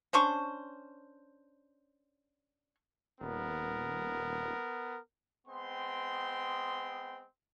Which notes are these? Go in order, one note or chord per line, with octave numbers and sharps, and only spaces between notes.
C#4 D4 C5 C#6
D#1 B3 A#4
G#3 B3 C4 G5 C6